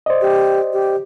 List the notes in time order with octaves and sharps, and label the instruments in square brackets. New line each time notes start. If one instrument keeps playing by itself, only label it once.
[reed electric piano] C5 D5 D#5
[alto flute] G4
G4